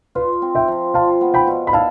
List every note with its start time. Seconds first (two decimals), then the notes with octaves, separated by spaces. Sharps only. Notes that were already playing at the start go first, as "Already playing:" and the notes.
0.15 F4 B4
0.42 C4
0.55 E5 G5
0.68 F3
0.94 F4 F5 A5
1.21 B3
1.34 G5 B5
1.47 B2
1.67 B5
1.73 E4 F5 A5